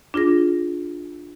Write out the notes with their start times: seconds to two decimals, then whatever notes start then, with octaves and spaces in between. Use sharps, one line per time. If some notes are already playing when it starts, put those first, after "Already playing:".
0.14 D4 F4 G#4 A#6